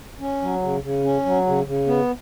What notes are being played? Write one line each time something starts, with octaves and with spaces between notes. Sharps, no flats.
C#4
F#3
C#3
C#3
C#4
F#3
C#3
C#3
B3